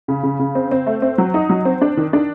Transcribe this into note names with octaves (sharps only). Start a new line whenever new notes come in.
C#3
C#3
C#3
C4
C4
A3
C4
F#3
D#4
F#3
C4
D4
D#3
D4